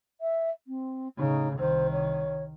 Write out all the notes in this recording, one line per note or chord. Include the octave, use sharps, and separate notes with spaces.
E5
C4
A2 C#3 D#4
C2 D#3 C5
C#5